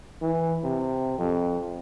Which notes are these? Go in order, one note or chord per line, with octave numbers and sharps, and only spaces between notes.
E3
C3
F2